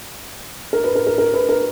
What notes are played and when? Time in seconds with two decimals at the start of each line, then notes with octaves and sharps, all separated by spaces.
0.73 A#4
0.84 B4
0.96 A#4
1.07 A#4
1.18 A#4
1.34 B4
1.49 A#4